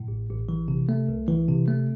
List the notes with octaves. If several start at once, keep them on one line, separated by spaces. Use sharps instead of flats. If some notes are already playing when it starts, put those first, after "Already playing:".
Already playing: A2
A1
A1
E3
C3
A3
C2
E3
C3
A3